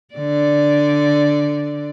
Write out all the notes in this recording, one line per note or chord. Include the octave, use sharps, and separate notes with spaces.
D3 D5